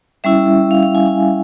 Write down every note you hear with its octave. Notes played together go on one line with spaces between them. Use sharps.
G3 C#4 E4 E5
F5
F5
G#5
G#5